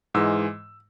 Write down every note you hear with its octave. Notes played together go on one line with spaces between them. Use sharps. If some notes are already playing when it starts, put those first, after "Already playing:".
G#2 E3 G#3 E6